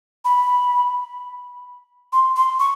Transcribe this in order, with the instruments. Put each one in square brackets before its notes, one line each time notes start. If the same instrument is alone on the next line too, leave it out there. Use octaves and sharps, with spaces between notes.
[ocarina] B5
C6
C6
C#6